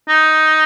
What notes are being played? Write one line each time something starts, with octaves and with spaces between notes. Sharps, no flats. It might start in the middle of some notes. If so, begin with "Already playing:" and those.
D#4